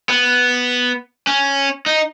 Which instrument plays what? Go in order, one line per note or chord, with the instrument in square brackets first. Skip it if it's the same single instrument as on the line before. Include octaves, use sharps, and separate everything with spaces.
[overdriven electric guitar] B3
C#4
D#4